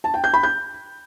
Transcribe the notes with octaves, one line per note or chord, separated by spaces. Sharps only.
A5
G5
G6
B5
G6